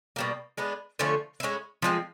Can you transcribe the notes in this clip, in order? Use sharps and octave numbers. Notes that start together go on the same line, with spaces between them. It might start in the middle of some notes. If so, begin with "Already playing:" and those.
B2 G3 A#3
G#3 B3 D4
D3 F3 A3 C#4
G#3 C#4 E4
F3 G#3 C4